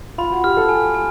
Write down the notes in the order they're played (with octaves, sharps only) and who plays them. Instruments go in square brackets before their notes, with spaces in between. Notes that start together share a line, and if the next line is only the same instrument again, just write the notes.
[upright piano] F4 [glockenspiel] B5
[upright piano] F#4
[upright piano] G4 [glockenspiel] F6
[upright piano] A4
[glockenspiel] G#5
G#5